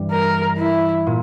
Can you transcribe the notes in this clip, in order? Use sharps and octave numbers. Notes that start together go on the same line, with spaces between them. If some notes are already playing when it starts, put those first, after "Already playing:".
Already playing: G2 E3 G3
A#4
E4
A#2